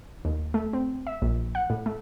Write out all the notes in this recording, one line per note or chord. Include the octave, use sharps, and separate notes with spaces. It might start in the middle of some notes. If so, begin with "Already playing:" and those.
D#2
A3
C4
E5
A#1
F#5
A2
A3